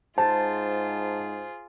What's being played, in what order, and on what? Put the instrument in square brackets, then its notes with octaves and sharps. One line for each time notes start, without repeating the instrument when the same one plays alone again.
[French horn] G#2 [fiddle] F4 G#4 [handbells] C5 A6 [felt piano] A5